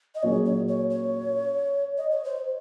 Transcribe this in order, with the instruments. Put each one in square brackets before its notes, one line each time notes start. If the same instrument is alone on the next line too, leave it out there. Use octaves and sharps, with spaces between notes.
[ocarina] D#5
[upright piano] A#2 F#3 A#3 C#4 G#4 [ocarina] C#5
[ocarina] C#5
C#5
C#5
D#5
C#5
C5